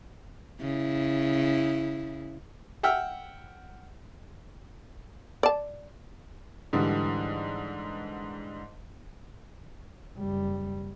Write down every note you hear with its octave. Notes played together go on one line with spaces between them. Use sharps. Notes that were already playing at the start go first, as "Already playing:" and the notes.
C#3 E4
E5 F#5 G5 E6 F6
D5 A5
G#2 D3 E3 G3
F#1 G3